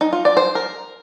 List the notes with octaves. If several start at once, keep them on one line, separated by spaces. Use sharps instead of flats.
D#4
F4
D5
C5
A#4